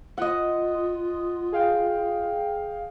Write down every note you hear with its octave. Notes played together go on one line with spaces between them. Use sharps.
F4 D#5 F#5
G#4 F5 G5